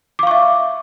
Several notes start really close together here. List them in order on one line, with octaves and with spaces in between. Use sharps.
D6 F5 C#6 E5